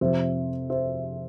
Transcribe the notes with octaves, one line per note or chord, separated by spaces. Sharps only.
F2 C3 F3 C5 E5
C5 E5